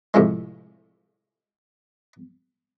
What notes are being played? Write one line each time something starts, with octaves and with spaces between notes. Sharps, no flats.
A2 C3 F3 G#3